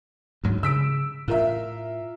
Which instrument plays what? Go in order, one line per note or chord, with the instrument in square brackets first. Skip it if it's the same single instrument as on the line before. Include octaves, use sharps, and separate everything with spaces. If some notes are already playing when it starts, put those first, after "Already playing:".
[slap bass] D2 G#2 F#3
[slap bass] C#3 [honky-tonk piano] E6 B6 D7
[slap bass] A2 [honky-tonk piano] F4 A#4 E5